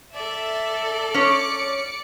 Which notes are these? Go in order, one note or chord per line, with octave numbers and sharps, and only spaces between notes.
A4 D5 E5
C#4 C#5 D6 C#7